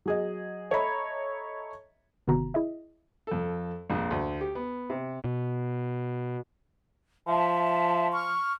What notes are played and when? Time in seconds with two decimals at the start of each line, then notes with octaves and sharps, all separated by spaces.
0.06 F#3 G#4 D#5
0.71 A4 C#5 D#5 E5 A#5 B5
2.27 G1 C3 D#3 B3 F#4 A#5
2.54 E4 G#4 D#5 E5
3.27 F2 A4
3.90 A#1 F2
4.11 D2
4.41 G4
4.55 B3
4.90 C3
5.24 B2
7.28 F3 E5 A5
8.12 C#6 F6